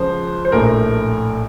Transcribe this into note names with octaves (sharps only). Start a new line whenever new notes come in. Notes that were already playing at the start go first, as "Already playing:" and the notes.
Already playing: C#2 C#3 F3 C5
C5
A#1 A2 A3 A#4